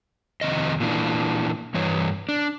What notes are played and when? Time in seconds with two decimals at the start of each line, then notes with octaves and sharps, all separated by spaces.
0.41 F2 C3 D#3 D#5
0.80 A#2 E3 D4
1.74 G2 E3 C#5
2.29 D4